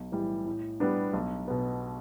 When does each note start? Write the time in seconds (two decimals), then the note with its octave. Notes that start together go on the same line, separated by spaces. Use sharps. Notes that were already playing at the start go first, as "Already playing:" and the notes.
Already playing: B1
0.12 A2 E3 G3
0.46 A2
0.80 G3 B3 D4
1.14 B1
1.48 B2 B3